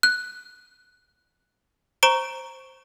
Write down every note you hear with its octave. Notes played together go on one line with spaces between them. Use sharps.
F#6
C5 A#5 C#6 D7 G7